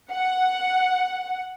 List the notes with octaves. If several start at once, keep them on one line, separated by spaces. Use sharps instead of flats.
F#5